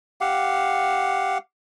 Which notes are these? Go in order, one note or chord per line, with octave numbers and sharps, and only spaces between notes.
G4 F5 F#5